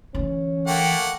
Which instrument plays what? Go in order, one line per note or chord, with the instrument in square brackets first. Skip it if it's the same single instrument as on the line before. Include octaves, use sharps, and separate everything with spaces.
[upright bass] D3 E3 [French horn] C#4
[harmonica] A3 A#3 F#5 [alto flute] G5